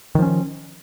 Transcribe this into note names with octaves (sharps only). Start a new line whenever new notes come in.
D#3 F3 C#4